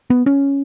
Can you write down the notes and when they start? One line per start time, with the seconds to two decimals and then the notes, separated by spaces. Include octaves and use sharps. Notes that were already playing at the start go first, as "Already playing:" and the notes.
0.10 B3
0.26 C#4